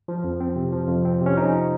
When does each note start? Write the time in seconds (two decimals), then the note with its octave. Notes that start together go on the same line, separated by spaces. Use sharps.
0.08 F3
0.24 F2
0.40 C4
0.56 C3
0.73 F3
0.88 F2
1.05 C4
1.21 C3 C#4
1.37 F3 D#4